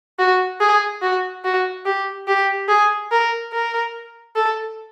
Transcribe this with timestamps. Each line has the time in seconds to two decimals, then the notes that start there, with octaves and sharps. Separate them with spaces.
0.19 F#4
0.61 G#4
1.02 F#4
1.45 F#4
1.86 G4
2.28 G4
2.69 G#4
3.11 A#4
3.53 A#4
4.36 A4